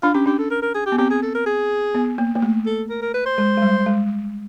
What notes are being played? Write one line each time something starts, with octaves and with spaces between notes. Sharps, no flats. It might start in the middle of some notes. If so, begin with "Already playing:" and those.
D4 F4
C#4 G4
D4 G4
A4
A#4
A#4
G#4
G4
B3
C4 G4
G#4
A4
A#4
G#4
B3
A#3
A#3
A3
A4
A#4
A#4
B4
C5
G#3
G#3
G3
G#3